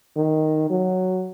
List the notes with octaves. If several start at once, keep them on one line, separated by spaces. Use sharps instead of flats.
D#3
F#3